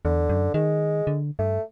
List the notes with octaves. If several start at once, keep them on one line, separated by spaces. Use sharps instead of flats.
E2 D3
F#2
D#3 G#3
D3
G2 A3